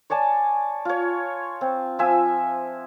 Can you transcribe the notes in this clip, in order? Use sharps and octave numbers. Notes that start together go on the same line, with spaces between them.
C#5 D5 G#5 A5
F4 C#5
C4
F3 E5 G#5 E6